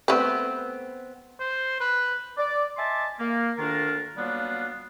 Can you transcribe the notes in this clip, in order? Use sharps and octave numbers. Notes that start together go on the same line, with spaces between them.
A3 B3 C4 B4
C5
B4
D5
D#5 E5 G#5 A5 C6 D6
A#3
D2 D#3 D4 F4 A#4
F#3 G3 A#3 B3 D4 F4